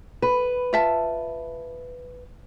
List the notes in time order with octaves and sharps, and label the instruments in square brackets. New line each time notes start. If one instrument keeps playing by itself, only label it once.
[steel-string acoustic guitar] B4
[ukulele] F4 E5 A5